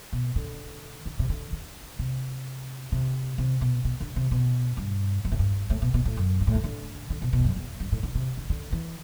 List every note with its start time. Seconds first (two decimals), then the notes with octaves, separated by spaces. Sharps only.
0.13 B2
0.36 D3
1.05 D3
1.19 C3
1.29 D3
1.52 D3
1.99 C3
2.92 C3
3.38 C3
3.61 B2
3.84 B2
4.00 D3
4.16 C3
4.31 B2
4.77 G2
5.25 G2
5.32 A2
5.39 G2
5.70 A2
5.82 B2
5.94 B2
6.05 A2
6.17 F#2
6.40 G2
6.47 A2
6.55 G2
6.64 D3
7.10 D3
7.22 B2
7.33 B2
7.39 E2
7.44 F#2
7.56 E2
7.80 G2
7.92 A2
8.03 D3
8.15 C3
8.37 D3
8.50 D3
8.72 E3